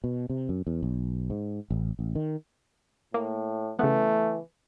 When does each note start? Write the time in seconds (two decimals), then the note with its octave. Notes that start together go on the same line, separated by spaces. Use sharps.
0.04 B2
0.30 C3
0.49 F#2
0.67 E2
0.83 B1
1.30 G#2
1.70 A1
1.99 A1
2.15 D#3
3.14 A2 A#3
3.79 C#3 E3 A3 B3